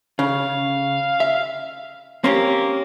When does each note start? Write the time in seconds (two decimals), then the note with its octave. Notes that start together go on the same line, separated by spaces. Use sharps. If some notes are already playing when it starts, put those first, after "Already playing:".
0.19 C#3 F5
1.20 E5
2.24 A#3 C4 C#4 G4